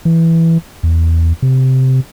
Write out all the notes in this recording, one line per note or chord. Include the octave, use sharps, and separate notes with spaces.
E3
E2
C3